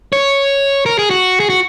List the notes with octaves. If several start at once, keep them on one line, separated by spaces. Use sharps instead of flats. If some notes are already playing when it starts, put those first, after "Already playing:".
C#5
A#4
G#4
F#4
G#4
F#4